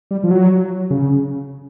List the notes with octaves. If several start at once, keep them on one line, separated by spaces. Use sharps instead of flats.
G3
F3
F#3
C#3